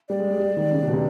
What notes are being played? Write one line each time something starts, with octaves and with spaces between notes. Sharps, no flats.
G3 D5
G#3
G#3
G3
D#3
C#3
C3
B2
C3